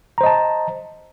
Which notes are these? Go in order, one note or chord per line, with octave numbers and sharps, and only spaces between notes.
C5 D#5 A5 A#5